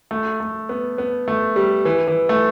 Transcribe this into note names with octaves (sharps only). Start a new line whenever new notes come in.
A3
A3
B3
B3
A3
G3
E3
E3
A3